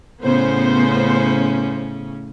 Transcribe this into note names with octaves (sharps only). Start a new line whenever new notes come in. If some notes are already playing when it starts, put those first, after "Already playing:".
A2 C#3 B3 C#4 C5